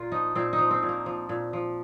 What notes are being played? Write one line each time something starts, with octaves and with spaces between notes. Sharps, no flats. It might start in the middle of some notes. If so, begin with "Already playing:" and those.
Already playing: A#2 F4 A#4
F3 D#4
A#2 C4
D#4
F3
C4
A#2
A#3
F3
A#2
F3